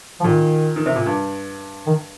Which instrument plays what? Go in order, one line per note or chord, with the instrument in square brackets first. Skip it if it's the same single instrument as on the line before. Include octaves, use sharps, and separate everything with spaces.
[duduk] F3
[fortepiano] A#2 [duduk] D#3
[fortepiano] D#3
C3
A#2
G2
[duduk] D#3